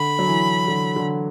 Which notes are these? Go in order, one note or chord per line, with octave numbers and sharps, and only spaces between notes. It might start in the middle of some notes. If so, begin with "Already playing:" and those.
Already playing: D3 B5
F#3
E3
D3
D3